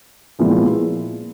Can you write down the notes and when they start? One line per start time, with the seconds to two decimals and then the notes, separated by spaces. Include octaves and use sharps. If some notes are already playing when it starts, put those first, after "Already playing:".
0.39 A#2 F3 G#3 B3 E4